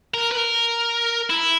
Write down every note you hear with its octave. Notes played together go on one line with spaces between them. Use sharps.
A#4
B4
A#4
E4